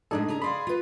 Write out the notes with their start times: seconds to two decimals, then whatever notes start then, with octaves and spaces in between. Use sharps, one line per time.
0.11 A2 G#3 D4 D#4 G#4 A4
0.28 C#3 G#4 A#5
0.42 G#4 D5 F5 B5 C6
0.67 F4 B4